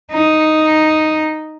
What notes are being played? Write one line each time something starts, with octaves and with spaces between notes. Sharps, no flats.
D#4